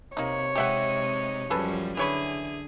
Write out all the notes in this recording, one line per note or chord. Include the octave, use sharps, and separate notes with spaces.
C3 A#3 D#4 C#5
C3 G#3 D#4 G4 E5 F#5
F#2 F3 G3 G#4 A4 B4
D3 E3 G#4 C#5 B5